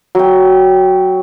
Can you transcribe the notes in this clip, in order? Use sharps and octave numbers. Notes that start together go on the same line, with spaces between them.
F#3 G5